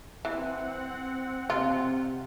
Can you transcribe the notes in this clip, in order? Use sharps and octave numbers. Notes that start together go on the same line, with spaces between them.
E3 C4 F#5
C3 F4